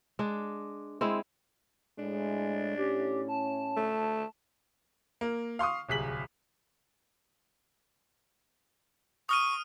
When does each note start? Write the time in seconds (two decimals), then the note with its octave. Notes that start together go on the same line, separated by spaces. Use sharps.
0.19 G#3 D4
1.01 G#3 C4 E4
1.99 A2 G#3 D4
2.77 A2 C#4 G4
3.28 A5
3.77 A3
5.21 A#3
5.59 F5 C6 C#6 D#6
5.89 D1 C2 G#4 B6 F#7
9.29 C#6 D#6 F6 D#7